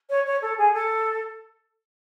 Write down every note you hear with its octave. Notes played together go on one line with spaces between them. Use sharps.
C#5
C#5
A4
G#4
A4